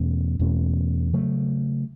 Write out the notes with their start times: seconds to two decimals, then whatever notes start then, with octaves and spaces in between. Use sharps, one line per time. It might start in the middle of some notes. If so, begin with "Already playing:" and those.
Already playing: E2 B2 A3 C#4
0.39 E2 B2 A3 C#4
1.13 C#3 F#3 A3